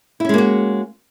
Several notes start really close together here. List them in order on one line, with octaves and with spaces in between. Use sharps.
E4 C#4 G#3 A#3 F#4